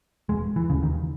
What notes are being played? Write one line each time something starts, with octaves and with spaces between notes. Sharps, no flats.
E1 G#3
E3
D#2 C#3
D#3